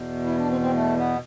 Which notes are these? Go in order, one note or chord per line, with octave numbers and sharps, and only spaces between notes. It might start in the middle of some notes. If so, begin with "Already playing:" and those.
Already playing: E2 B2
E4
D4
C4
C4
A3
B3